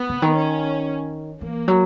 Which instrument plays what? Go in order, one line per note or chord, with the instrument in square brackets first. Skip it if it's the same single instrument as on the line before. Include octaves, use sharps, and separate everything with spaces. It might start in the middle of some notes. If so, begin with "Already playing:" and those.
Already playing: [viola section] B3
[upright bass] C#3
D#3
[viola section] C#4
[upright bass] E3 [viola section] A#3
[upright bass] F#3